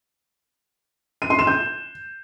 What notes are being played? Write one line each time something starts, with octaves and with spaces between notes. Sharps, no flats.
D#7
C6
E7
G6